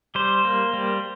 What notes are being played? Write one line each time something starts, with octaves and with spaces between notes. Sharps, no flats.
G3 C5
A#3
G3